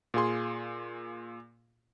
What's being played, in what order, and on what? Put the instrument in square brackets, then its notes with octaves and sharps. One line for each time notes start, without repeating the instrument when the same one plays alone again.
[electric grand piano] A#2 F4 G#4 C6